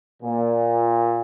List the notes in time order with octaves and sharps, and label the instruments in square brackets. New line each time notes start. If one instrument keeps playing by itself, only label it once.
[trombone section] A#2